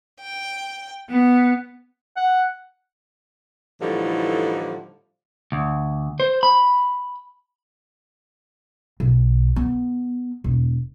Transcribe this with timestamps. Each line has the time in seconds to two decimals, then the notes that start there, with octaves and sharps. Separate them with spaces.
0.20 G5
1.10 B3
2.17 F#5
3.81 A2 D3 E3 F3 G3 D#4
5.52 D2
6.20 C5
6.43 B5
9.00 B1
9.56 B3
10.44 E1